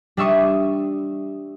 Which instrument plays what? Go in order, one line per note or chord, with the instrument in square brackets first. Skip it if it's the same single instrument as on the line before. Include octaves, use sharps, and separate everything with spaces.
[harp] G3 D4 E5 C#6 D#6